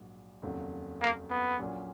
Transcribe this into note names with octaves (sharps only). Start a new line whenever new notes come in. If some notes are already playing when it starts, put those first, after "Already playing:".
Already playing: A#1 G#2 F#3
F1 D#2 C#3 F#3
A#3
B3
A#1 A#2 F#3 C#4